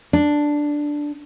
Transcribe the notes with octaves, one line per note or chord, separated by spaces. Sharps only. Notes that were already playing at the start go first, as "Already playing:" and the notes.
D4